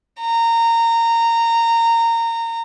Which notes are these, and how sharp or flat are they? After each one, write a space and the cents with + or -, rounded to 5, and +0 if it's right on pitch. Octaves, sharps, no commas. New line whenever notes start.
A#5 -20